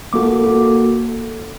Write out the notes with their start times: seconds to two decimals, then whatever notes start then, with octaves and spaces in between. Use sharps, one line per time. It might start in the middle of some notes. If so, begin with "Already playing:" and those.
0.13 A#3 F#4 A4 D6
0.43 A#3 F#4 A4